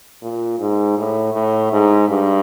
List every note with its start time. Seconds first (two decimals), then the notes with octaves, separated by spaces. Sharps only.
0.22 A#2
0.59 G#2
0.97 A2
1.34 A2
1.72 G#2
2.09 G2